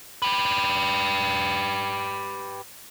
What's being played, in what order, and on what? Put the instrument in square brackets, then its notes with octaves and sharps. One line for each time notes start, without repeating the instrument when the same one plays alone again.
[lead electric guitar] G4 B4